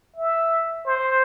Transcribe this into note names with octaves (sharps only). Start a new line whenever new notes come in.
E5
C5